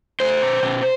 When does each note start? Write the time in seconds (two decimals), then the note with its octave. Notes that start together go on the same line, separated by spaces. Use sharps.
0.20 A3 C5
0.42 B2
0.63 B2